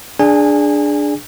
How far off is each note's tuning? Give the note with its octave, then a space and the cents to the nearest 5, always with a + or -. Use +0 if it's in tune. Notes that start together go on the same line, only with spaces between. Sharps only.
D4 +0 G#4 +0 G#5 -25